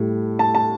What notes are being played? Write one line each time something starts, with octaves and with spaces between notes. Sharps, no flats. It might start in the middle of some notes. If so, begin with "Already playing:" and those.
Already playing: A2 G3
A5
A5